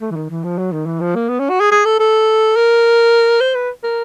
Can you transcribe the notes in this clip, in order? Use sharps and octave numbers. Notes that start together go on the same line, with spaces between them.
A3
E3
D#3
E3
F3
F#3
D#3
E3
F3
A#3
B3
C#4
F#4
G#4
G#4
A4
A4
A#4
C5
B4
A#4